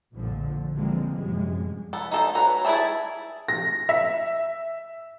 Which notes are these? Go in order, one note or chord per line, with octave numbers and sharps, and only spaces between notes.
A#1 F2 A#2 D3 F3
D3 E3 F3 G#3 A#3 C4
F#2 A2 C3 F3 G3 G#3
B3 A4
D#4 A4 C5
F#3 B4 A#5
E4 G#4 C5 E5 A5
A#6
E5